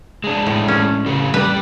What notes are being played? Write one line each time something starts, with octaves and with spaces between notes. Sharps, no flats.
G#3 D4
A2
C#4
C#3 G4 A4
G3 G4 B4